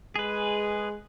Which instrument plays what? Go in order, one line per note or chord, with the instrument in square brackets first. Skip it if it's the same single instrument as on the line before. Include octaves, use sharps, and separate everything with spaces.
[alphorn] G#3 [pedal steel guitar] G#4 B4